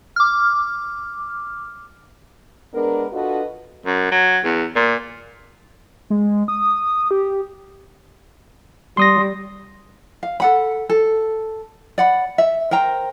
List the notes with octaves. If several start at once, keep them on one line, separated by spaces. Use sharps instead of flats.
D6 F6
G#3 B3 D4 A#4
D4 F4 F#4 A4 B4 D#5
F#2
F#3
E2
A#2
G#3
D#6
G4
G3 C6 D#6 A#6
F5
A4 F#5 B5
A4
D5 F#5 B5
E5
A#4 C5 G5 A#5